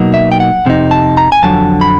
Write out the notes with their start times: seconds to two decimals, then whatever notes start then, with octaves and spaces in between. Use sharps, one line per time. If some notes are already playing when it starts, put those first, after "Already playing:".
Already playing: B2 F#3 A#3 D#4
0.14 E5
0.32 G5
0.40 F#5
0.66 F2 C3 D#4
0.91 A5
1.17 A#5
1.32 G#5
1.43 F2 D3 F#3 A5
1.81 B5